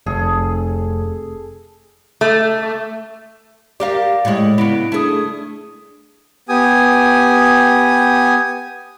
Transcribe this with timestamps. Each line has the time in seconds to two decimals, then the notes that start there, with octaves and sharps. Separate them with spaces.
0.06 F1 G#4 A4
2.21 A3
3.80 G4 A#4 D5 F5
4.25 A2 G#3
4.58 C#3 B3 E4 D7
4.92 A3 D4 G#4 D#6
6.49 B3 G4 G#5 D#6